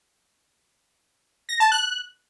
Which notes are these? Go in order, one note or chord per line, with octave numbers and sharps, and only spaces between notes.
A#6
A5
F#6